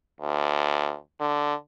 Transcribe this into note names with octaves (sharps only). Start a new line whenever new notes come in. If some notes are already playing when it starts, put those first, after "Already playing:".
D2
D3